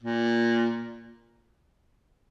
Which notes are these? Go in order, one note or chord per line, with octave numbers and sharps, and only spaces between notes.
A#2